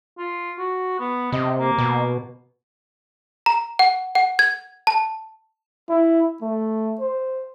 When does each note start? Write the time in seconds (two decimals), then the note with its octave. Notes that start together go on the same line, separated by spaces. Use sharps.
0.18 F4
0.59 F#4
1.00 B3
1.32 C3 D#5
1.59 A#3
1.78 B2
3.46 A#5
3.79 F#5
4.15 F#5
4.39 G#6
4.87 A5
5.89 E4
6.42 A3
7.00 C5